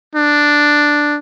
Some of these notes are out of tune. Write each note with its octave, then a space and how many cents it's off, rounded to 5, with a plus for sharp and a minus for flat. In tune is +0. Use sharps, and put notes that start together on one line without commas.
D4 +0